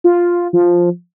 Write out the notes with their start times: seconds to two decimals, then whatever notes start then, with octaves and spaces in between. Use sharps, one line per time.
0.04 F4
0.53 F3